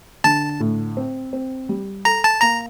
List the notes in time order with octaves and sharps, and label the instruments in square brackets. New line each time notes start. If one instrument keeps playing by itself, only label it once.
[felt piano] D3 [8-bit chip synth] A5
[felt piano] A2
C4
C4
G3
[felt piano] A4 [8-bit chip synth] A#5
[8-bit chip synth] A5
[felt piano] A#3 [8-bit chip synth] A#5